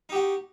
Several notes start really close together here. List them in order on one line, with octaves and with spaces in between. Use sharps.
D#4 G4 F#4